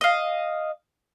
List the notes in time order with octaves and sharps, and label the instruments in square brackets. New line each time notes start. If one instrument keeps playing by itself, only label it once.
[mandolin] D#5 F5